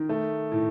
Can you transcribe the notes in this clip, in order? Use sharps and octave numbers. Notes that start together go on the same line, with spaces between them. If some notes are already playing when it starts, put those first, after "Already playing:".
Already playing: D#3
A3
A2